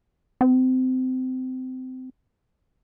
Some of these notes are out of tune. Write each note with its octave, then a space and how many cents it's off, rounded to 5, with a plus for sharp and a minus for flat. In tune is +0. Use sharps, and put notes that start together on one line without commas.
C4 -25